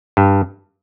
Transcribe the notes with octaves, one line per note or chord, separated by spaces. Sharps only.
G2